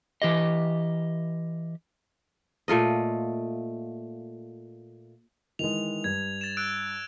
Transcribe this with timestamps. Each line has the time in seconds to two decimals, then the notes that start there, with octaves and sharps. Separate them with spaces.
0.22 E3 G4 D#5
2.68 A#2 A3 F4 D#5
5.59 D#3 E3 G#3 F7
6.04 G2 G#6
6.41 A6 E7
6.57 E6 F#6 D7